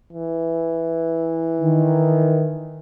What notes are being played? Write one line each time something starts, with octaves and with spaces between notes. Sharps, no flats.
E3
D#3